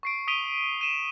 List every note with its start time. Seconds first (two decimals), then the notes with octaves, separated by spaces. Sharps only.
0.03 C#6 C7 D7
0.28 D#6 B6 D7 D#7 F7 G7
0.81 D#7 E7